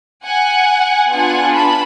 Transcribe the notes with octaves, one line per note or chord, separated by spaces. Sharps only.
F#5 G#5
B3 D4 F4 G#4 F#5 G#5
A5 B5